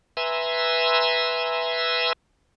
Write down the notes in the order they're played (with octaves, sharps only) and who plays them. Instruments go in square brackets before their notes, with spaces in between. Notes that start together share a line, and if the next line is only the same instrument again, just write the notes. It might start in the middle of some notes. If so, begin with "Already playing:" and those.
[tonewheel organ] B4 E5 G#5 A#5 C6 E6